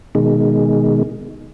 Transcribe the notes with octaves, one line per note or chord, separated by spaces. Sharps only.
B2 D#3 G#3